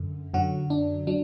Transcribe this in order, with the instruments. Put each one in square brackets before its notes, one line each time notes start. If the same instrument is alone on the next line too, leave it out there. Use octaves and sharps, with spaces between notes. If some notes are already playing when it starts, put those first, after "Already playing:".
Already playing: [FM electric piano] F#2 D3
F#2 D3 F#3 F#4
D4
F#3 D4